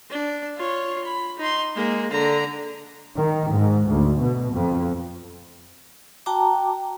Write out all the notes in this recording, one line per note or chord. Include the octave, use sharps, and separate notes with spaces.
D4
F4 C#5
B5
D#4 C6
G#3 A#3
D3 A#5
D#3
G#2
D2
B2
F2
F#4 G5 A5 A#5 D6